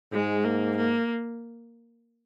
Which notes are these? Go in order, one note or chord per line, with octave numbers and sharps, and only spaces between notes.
G#2 G#3
A#3
A#3